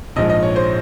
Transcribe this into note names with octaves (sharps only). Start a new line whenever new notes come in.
A#1 G#2 F3 G#3 D#5
D#5
C#5
C5